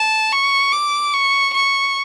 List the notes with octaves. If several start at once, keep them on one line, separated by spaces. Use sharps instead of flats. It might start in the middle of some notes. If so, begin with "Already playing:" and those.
Already playing: A5
C#6
D6
C#6
C#6